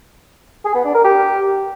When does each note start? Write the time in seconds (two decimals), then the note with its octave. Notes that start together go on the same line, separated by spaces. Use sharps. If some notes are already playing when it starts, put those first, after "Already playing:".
0.65 G#4
0.75 B3
0.85 D4
0.94 A#4
1.04 G4